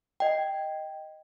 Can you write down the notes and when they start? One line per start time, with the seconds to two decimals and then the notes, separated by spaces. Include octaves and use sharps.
0.20 D#5 G5